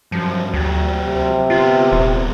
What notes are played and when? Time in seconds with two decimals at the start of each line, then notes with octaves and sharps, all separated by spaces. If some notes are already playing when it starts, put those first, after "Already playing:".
0.12 G2 F3 F#3
0.53 D2 F#3 G4
1.05 C3
1.50 B3 F4 G4
1.92 D#1 E2 F4